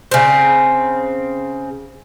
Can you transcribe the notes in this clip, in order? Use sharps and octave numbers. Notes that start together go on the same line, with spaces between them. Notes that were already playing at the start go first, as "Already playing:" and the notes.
C#3 C4